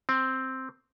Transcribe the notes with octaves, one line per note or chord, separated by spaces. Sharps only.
C4